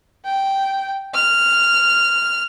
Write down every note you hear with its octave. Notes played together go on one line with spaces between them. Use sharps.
G5
F6